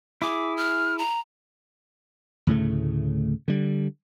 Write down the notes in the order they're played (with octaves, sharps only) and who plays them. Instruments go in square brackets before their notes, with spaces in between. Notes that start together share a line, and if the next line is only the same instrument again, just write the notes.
[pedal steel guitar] E4 G#4 [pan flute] D6
[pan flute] F6
A#5
[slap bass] D2 A2 C#3 A3
D3 G3